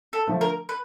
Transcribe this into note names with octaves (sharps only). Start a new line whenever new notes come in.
A4
D3 F3 A3
A#4
B4